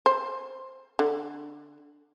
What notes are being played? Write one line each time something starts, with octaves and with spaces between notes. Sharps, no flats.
C5
D3